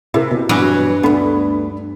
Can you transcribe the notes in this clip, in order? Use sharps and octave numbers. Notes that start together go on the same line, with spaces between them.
C3 E4 G#4 A#4
B2
G2 E3 F#3
D2 B3 D4 A4 B5